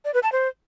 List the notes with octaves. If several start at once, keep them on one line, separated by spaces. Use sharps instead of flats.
D5
B4
A5
C5